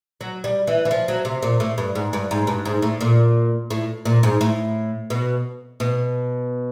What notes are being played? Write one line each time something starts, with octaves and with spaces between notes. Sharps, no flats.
F#3
G3
E3
E3
F3
F#3
C3
A#2
A2
G2
G#2
G2
G#2
G2
G#2
A2
A#2
A2
A#2
G#2
A2
B2
B2